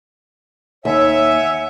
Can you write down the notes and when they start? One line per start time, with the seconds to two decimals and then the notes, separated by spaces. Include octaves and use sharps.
0.85 D#2 C#5 E5 F#5 G#5